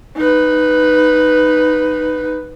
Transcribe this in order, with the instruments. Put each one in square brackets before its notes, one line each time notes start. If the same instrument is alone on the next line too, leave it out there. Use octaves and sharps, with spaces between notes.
[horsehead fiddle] D#4 B4